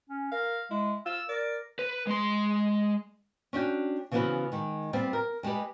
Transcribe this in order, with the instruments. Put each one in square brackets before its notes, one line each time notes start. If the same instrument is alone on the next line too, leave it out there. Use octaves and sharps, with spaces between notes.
[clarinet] C#4
[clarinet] A#4 [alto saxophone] F5
[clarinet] G#3 [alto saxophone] E4
[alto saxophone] F4 [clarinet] E6
[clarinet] A#4 [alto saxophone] D5
[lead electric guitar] B4
G#3 C6
[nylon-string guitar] C#4 D4 F#4 G5
C#3 E3 F3 B3 F#4 B4
D#3 G#3
G3 B3 C4 F4
A#4
G3 G#3 F4 G4 B4